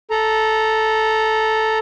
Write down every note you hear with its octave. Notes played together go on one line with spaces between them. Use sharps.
A4 A#5